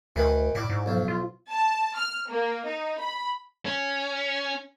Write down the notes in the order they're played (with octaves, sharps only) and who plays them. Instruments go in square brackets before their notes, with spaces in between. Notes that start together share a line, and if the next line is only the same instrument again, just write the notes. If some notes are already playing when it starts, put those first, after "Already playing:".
[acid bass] D2 [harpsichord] D#3 E3 B4
[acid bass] A2 [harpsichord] E4 D5
[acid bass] G#2
[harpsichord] B1 F3
[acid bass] F4
[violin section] A5
F6
A#3
D#4
B5
[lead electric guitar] C#4